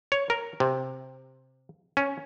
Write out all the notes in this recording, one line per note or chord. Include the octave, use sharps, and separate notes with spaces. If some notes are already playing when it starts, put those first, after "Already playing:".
C#5
A#4
C3
C#4